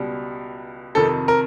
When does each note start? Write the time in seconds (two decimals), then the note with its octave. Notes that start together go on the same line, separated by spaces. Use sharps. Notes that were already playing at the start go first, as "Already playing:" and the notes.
Already playing: C#2 B2 G3
0.95 F2 C3 D#3 A4
1.28 A#4